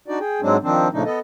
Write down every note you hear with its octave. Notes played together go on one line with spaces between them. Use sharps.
D4 D#4 F#4 D5
G#4 G5
G#2 F#3 G#3 C4 D4
D#3 F3 C4 D4
A#2 C#3 F3 A3 D4 D#4
B3 A4 D#5